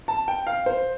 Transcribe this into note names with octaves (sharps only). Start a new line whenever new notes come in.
A5
G5
F5
C5